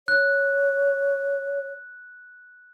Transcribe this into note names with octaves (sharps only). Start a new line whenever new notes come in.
C#5 F#6